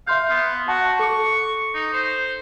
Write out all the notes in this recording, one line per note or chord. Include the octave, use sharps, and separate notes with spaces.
E5 F5 C6 G6
B3
F#4 F#5 A5 C#6
A4 C#6 D6
D#4
C5